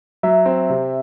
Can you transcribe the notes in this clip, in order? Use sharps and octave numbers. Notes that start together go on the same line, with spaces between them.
F#3 E5
C4
C3